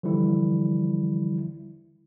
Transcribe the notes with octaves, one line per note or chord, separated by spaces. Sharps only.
D3 E3 F3 G3 E4